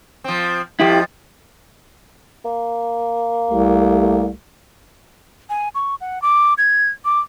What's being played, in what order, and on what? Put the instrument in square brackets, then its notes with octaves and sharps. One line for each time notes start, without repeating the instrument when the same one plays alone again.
[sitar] F3 C4
[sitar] F2 F3 [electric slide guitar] E4 G4
[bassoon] A#3
[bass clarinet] C2 [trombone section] A3 G4
[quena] G#5
C#6
F#5
D6
G#6
D6